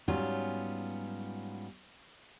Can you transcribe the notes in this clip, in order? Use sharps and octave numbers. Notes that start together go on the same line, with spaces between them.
G#2 F#3 G3 B3 C#4 F4